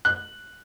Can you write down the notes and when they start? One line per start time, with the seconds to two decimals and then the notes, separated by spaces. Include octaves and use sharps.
0.05 F#6